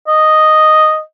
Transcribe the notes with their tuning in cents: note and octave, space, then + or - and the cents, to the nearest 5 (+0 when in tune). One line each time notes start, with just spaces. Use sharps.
D#5 +0